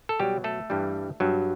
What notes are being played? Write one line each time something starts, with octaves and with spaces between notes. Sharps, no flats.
A4
B2 F#3 G3 G4
A3 A4
G2 E3 G3
G2 F#3